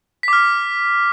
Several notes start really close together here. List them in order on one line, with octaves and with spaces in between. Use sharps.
B6 D6 F6